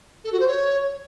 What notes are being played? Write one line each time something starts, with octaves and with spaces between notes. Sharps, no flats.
A4
F#4
C5
C#5